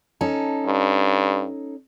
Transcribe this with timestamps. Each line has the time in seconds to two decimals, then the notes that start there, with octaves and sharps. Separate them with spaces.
0.21 C#4 D#4 A4
0.66 G2